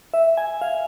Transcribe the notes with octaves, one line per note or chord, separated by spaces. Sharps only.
E5
G#5
F5